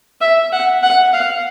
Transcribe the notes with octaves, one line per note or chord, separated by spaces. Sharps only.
E5
F#5
F#5
F5